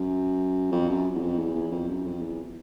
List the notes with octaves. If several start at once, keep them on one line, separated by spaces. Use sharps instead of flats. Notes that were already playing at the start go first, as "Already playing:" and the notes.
Already playing: F#2
F2
F#2
E2
F2
E2
E2
F2
F#2
F2
E2